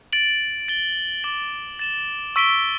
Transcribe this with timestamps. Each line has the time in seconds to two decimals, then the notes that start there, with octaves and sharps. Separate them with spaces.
0.13 A6 D7 F#7
0.68 A6 D7 G7
1.24 D6 A6 E7
1.79 A6 E7 G7
2.36 C#6 E6 B6 D7 G7